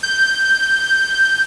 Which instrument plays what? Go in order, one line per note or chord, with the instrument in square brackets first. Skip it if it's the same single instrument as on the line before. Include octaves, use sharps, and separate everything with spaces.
[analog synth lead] G6